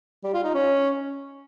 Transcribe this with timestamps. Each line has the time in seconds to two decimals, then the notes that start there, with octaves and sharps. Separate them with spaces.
0.24 G3
0.34 F4
0.44 D#4
0.54 C#4